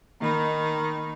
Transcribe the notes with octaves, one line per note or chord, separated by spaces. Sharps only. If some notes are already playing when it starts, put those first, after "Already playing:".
D#3 A#3 D#4 B5